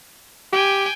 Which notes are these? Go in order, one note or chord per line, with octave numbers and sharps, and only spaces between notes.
G4 G5 G#5